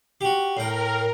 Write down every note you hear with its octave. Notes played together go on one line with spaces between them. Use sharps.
F#4 G4
A2 A#4 G5